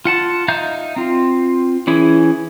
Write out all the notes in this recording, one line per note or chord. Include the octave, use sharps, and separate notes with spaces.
F4 F#5 A5
D#4 E5 F5 A#5 G6
C4 F4
E3 C#4 E4 G#4